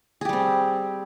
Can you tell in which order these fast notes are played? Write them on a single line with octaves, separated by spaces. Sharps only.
G#4 G4 G3 C4